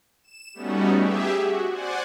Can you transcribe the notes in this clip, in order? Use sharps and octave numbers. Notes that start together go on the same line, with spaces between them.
E7
G3 A3 B3 C#4 D#4 F#4
G4 G#4 E5
F#4
C5 D5 F#5 G#5